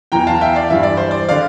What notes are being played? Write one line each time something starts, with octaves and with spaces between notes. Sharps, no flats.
E2 E3 G5 A#5
F5 A5
E5 G5
D5 F5
G2 E3 E5
D5
C5
D5
D3 D5 F5